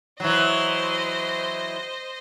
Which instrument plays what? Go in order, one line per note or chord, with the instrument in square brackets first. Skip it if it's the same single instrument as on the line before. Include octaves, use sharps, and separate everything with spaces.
[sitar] E3 F#3 [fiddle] C5 D#5